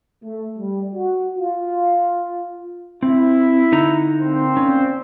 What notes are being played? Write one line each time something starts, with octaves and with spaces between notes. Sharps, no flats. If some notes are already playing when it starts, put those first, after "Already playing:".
A3
G3
F#4
F4
C4 E4
D3 D#4 A#5
A#2 C4 C5
C#4